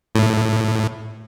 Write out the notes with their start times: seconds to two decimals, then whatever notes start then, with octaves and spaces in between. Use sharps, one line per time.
0.15 A2